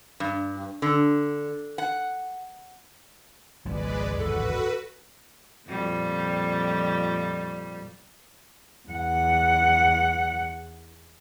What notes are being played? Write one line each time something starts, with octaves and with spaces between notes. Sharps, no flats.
G2
D3
F#5
G#1 C#2 F3 G#3 B4 D5
D1 G#1 E2 F#4 A4 B4
F2 A#2 G3
E2 F#5